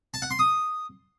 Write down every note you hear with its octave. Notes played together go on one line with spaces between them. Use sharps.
A5
F#5
C6
D#6